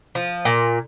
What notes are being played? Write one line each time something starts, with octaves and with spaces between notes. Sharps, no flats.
F3
A#2